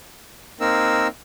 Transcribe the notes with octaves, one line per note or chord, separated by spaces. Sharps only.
A#3 C4 D#4 A#4 E6